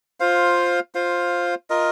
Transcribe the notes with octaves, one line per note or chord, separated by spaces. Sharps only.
F4 C5 F5
F4 C5 F5
F4 A#4 D#5